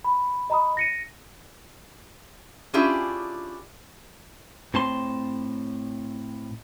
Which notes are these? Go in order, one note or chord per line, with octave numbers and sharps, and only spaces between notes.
B5
D#5 A#5 B5 D#6
A#6 C#7 D#7
C#4 D4 E4 F4 G4 G#4
A2 C4 A5 C6